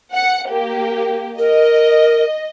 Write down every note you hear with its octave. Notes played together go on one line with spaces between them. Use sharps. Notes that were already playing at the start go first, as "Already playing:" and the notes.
F#5 C#7
A#3 G4
A#4 D#5